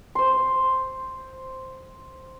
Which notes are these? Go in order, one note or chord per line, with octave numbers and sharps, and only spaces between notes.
C5 C6